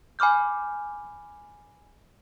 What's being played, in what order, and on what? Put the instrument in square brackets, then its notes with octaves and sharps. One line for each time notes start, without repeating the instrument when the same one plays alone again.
[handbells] G#5 B5 D6 F6 G6